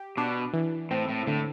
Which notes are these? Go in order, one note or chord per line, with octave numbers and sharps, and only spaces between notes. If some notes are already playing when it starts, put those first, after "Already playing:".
Already playing: G4
B2 D4
E3
A2 C4
A2
A2 D3